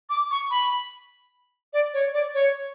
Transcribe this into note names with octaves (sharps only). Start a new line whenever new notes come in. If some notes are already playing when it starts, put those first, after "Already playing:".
D6
C#6
B5
D5
C#5
D5
C#5